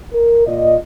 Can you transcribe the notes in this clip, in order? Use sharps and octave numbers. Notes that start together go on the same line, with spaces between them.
A#4
A#2 F4 D5 D#5